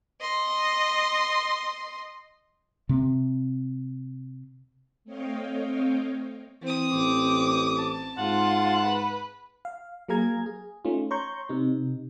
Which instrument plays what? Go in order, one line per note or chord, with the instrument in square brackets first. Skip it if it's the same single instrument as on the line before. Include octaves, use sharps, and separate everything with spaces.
[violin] D#5 C6
[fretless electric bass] C3 C4
[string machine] A3 C4 C#5 D#5 F5 G5
[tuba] E3 [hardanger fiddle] C4 D#6
[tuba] A1 [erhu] D6
[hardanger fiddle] A5
[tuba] G#2 [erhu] F4 [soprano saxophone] F#5
[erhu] B4
[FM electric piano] F5
F#3 A#3 G#4 F5 A#5 G#6
G#4
A3 C#4 D#4 F4
C#5 A#5 C6 C#6 G6
C3 D#4